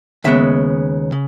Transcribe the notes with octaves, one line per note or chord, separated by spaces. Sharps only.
D#2 C#3 G#3 B3 E5
C#3